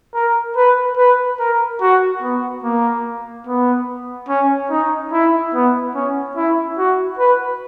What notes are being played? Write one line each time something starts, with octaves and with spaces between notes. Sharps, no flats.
A#4
B4
B4
A#4
F#4
B3
A#3
B3
C#4
D#4
E4
B3
C#4
E4
F#4
B4